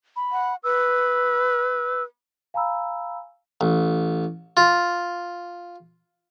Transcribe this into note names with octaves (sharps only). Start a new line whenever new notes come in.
B5
F#5
B4 E6
F5 G#5 A#5 B5 E6
A1
F4